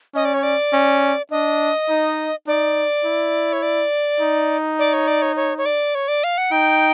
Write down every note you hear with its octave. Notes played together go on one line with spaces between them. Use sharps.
C#4 D#5
D5
C#5
D5
C#4
D4 D#5
D#4
D#4 D5
E4
C#5
D5
D#4
D5
C#5
D5
C#5
C#5
C#5
D5
C#5
D5
F5
F#5
D#4 G5